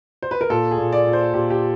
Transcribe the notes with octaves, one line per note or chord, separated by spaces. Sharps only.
C5
B4
A#4
A#2 A4
G#4
A#2
D5
A#2
C5
A#2 G4
G4